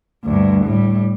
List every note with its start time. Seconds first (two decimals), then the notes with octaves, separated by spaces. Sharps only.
0.24 D2 G2
0.65 A2 G3